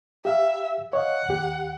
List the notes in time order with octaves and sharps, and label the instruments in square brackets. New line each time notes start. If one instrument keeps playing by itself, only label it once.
[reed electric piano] G4 F5 [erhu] E5
[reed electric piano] C#5 D#5 F5 [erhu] F#5
[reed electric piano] D#2 G4